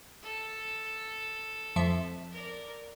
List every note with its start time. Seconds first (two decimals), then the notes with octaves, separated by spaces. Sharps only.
0.23 A4
1.76 F2 F3 E5
2.32 A#4 D5